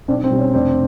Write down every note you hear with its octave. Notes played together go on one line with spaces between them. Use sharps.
B1 C4 D4
C4
B2 G3
C#4
F1 C4 D4